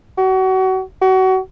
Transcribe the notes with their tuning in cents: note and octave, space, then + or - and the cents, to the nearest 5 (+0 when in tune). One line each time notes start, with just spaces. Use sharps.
F#4 +30
F#4 +30